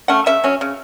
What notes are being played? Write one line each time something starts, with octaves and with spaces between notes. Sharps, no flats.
A3 C#4 F#5
C#3 E5
F#3 C#4
C#3